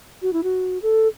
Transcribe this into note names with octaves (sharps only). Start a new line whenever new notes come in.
F#4
E4
F#4
A4